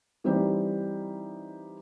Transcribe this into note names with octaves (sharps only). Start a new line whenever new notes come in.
E3 G3 C4 D#4 G4